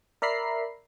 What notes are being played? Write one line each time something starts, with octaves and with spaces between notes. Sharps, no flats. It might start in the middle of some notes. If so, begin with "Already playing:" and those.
A#4 D5 E5 A#5 B5 C7